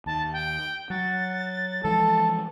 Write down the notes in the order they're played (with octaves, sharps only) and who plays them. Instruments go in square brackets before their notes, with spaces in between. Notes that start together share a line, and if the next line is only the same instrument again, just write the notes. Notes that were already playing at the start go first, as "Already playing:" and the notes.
[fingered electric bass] D#2 [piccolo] A5
[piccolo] G5
[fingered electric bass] F#3 [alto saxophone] F#5 [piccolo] A6
[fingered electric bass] E3 F3 G#3 [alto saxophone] A4